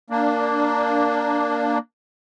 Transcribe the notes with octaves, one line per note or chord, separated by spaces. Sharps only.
A#3 D4